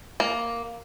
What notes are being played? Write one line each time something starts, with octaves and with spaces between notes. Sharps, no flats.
A#3